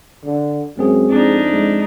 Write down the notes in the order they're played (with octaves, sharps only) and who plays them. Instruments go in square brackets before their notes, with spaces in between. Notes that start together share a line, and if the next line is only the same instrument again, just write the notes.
[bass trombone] D3
[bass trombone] F#2 [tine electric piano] G#3 C4 G#4
[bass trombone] F2 [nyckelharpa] D4 D#4
[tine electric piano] G#3